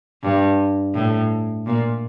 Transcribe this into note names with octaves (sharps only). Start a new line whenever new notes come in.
G2
A2
A#2